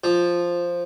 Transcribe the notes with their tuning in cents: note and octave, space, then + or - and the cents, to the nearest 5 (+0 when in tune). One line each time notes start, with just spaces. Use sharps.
F3 +0